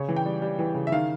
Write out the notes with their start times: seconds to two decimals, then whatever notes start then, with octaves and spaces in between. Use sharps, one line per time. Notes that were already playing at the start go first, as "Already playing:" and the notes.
Already playing: C#3 C#5
0.08 E3
0.16 G5
0.25 G3
0.42 G3
0.59 E3
0.74 C#3
0.87 E5
0.92 D#3 F5